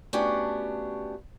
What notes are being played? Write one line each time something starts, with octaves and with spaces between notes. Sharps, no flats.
A3 B3 C#4 D4 F#4 G4